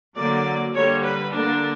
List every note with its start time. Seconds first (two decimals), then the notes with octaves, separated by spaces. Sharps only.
0.17 D3 F#3 A#3 D5
0.74 D3 G3 A#3 C#5
1.03 B4
1.31 D3 A#3 D4